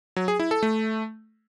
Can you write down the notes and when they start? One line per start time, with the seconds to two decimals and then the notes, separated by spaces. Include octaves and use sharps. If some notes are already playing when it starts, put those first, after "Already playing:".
0.16 F#3
0.28 G#4
0.39 E4
0.51 A4
0.63 A3